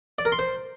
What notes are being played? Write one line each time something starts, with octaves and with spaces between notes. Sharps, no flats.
D5
A#4
C6
C5